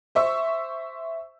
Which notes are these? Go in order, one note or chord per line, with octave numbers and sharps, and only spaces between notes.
C5 E5 C#6 E6